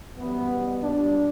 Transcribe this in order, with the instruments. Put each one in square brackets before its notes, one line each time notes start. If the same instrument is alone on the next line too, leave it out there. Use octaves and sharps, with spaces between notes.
[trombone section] F#2 E3 G3 B3
B2 G3
A#2 G3 D4